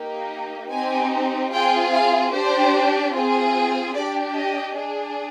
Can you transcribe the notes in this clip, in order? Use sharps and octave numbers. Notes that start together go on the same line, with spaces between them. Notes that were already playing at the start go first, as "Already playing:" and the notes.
Already playing: A#3 D#4 G4
C4 D#4 G4 G#5
C4 F4 G#4 G5
F5
D4 G4 C5
C4 F4 G#4
D4 G4 D5
D#5
D4 G#4